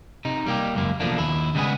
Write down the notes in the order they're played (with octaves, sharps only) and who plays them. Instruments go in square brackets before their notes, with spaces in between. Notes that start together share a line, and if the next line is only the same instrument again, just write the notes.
[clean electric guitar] C3 D#4
G3 A#3 G4
C#2 F#2 A#3
E2 B2 F3 A3 A#3 D4
D#2 E4
C#3 G3 G#3 B3 G#4